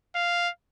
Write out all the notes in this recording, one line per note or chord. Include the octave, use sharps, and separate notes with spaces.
F5